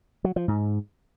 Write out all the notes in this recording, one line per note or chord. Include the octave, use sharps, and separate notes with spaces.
F#3
F3
G#2